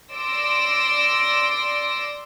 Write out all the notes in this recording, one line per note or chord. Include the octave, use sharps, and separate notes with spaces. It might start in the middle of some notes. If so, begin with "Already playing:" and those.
D5 C6 E6 A#6 D7